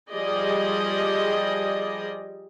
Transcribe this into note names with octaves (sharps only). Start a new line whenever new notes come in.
F3 G3 G#4 D5 D#5